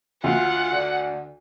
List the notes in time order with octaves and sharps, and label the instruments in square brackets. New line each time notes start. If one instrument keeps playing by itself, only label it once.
[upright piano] D2 [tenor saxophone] F4 [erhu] F#5
[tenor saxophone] D3